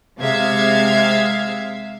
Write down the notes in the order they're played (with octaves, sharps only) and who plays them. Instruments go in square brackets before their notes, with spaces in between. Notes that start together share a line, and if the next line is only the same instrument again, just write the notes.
[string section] C3 G#3 E5 F5 G#6